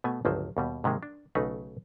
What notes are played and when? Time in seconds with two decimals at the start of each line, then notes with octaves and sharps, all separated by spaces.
0.04 B2 A3 B3 G#5
0.25 G1 C#2 F3 F#3 C5
0.57 D#2 B2 G3
0.84 G#2 C3 D#3 G#3 A#3
1.03 D4
1.35 B1 C#3 A3 D#4 B4 F#5